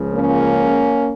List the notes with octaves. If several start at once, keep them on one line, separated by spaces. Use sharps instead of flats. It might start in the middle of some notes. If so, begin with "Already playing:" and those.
Already playing: C#2 C#3 F3
A#3 C#4